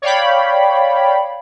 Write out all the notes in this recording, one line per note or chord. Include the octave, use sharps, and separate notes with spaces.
C#5 D5 F5 G5 B5